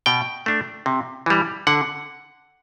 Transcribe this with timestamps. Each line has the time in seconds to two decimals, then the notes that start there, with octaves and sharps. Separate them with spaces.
0.06 B2 G5
0.46 A3 D4
0.86 C3
1.26 E3 G3
1.67 D3 F#5